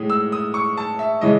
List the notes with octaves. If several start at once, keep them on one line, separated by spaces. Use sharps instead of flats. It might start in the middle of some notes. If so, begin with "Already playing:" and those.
Already playing: A2 G#3 D#6
E6
D#6
C#6
A5
E5
C#3 E3 G#3 D#5